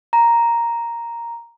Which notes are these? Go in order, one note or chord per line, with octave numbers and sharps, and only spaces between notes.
A#5